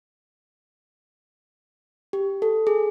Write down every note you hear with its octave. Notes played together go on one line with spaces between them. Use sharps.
G4
A4
G#4